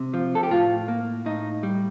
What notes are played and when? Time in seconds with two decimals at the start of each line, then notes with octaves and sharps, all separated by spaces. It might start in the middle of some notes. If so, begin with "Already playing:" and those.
Already playing: C3
0.14 F3
0.35 A4
0.43 G4
0.51 A2 F4
0.88 A#3
1.26 A2 D#4
1.63 G3